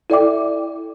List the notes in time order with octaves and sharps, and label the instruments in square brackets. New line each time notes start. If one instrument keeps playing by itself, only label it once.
[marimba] E4 A4 D5 E5 G5 D6